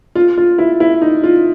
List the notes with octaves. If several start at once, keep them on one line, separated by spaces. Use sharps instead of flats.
F4
F4
E4
E4
D#4
F4